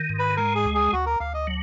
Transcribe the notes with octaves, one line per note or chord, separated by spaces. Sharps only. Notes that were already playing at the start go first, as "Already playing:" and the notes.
Already playing: D#3
G#2
B4
G#3 A#4
G#4
D2
G#4
D2 F#4
A#4
D2 F5
D#5
F#3